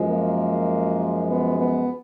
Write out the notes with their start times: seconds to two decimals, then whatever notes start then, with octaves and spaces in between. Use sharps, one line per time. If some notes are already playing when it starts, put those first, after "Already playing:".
Already playing: F#2 F3 G#3
0.09 A#3
1.29 B3
1.59 B3